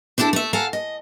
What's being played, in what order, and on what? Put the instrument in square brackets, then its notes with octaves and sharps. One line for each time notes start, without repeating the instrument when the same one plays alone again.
[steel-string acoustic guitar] C4 D4 E4 G4 A4
A3 E5
A4 F5 F#5 G#5 A#5
D#5